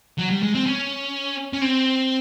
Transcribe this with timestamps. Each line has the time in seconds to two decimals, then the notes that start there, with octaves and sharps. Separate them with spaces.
0.18 F#3
0.30 G3
0.42 G#3
0.54 C4
0.66 C#4
1.53 C#4
1.61 C4